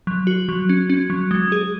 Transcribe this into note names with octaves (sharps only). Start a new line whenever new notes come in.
F#3
F#4
F#3
C#4
C#4
F#3
G#3
G#4